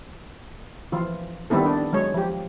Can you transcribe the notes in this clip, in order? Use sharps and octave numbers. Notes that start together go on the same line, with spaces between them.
E3 F3 F4
D#3 G3 B3 C4 E4 A4
D4
F#3 G#3 C#5
F3 G4